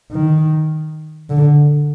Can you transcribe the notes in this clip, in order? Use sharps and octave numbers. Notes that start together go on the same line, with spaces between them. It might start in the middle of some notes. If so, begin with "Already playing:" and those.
D#3
D3